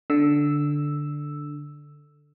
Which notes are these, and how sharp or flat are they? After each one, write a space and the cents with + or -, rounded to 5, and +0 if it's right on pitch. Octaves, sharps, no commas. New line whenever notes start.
D3 +0 E6 +0